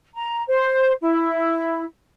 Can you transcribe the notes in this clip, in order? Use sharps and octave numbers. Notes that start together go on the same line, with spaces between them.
A#5
C5
E4